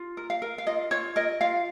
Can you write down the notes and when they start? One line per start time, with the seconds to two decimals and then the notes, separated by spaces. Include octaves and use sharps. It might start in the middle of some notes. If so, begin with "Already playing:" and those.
Already playing: F4
0.17 A#4
0.30 F5
0.42 A#4
0.58 F5
0.67 F4 D#5
0.91 F4 C#5
1.16 A#4 D#5
1.41 F4 F5